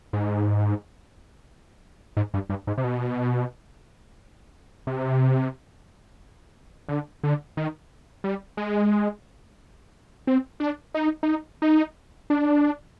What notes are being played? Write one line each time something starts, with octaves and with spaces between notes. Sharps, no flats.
G#2
G#2
G2
G2
G#2
C3
B2
C3
D3
D3
D#3
G3
G#3
C4
D4
D#4
D#4
D#4
D4